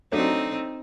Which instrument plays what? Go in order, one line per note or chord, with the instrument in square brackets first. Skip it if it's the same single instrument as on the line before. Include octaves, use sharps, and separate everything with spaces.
[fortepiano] F#3 A3 D4 [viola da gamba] C4 D#4